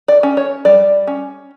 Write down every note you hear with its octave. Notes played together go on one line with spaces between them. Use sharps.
D5
C#4
C#5
G3 D5
C#4